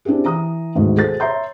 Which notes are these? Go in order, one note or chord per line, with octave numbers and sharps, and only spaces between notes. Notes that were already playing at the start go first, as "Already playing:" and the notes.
C4 D4 E4 G4 G#4
E3 A#5 D#6
D2 G#2 B2 D#3
F#4 G#4 A4 C5 A6
C#5 E5 A#5 C6 G6